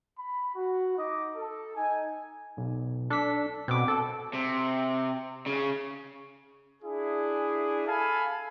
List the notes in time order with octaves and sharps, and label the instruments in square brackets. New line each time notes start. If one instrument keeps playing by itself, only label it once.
[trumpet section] B5
F#4
D#4 D#5 D6
A4
D#4 G#5
[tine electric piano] B1
[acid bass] D4 [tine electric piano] A4 B6
[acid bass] B2 [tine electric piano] C4 D6
[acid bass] A4
[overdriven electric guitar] C3
C#3
[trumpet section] D4 E4 G#4
A4 F5 G#5 A5 B5